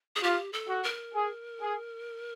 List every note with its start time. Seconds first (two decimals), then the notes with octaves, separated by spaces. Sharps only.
0.16 G#4
0.22 F4 G4
0.53 A4
0.69 F#4
0.84 A#4
1.14 G#4
1.61 G#4